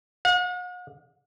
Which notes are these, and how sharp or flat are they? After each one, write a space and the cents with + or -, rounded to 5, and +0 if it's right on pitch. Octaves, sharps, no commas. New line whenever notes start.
F#5 -45